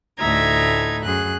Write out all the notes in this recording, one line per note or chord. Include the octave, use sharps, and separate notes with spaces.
D2 A2 D#4 E5 A#5 G#6
F#2 G#4 F#6